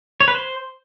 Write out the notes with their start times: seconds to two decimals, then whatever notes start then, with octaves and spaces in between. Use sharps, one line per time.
0.21 C#5
0.28 B4
0.35 C5